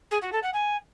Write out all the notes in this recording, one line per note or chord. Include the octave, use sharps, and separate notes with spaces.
G#4
F#4
A4
F#5
G#5